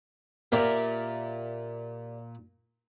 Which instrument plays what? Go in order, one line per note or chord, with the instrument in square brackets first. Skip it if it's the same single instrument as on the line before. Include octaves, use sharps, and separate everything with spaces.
[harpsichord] A#2 A#4 [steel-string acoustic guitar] G4 D5 E5